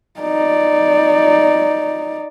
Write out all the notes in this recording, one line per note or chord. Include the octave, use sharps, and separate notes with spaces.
D#4 D5